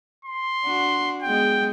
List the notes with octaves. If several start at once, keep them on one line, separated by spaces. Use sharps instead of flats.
C6
D4 F#4
G#3 B3 G5